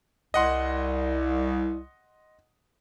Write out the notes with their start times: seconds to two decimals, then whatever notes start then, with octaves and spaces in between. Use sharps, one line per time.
0.34 C2 D#5 F#5 C6